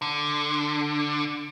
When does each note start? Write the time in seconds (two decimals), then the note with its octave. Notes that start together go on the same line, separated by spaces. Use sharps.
0.02 D3